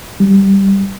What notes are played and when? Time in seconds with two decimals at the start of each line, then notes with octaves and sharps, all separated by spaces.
0.20 G3